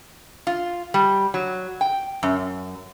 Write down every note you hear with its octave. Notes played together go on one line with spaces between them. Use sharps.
F4
G3
F#3
G5
F#2